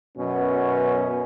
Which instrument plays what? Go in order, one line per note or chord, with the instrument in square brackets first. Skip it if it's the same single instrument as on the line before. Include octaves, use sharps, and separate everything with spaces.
[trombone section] F#2 B2 B3 C#4